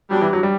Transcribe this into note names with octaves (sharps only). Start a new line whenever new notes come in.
F#3 G3 B3 D4
E3
F#3
G3